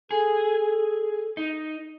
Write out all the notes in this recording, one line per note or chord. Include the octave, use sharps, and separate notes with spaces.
G#4 A4
D#4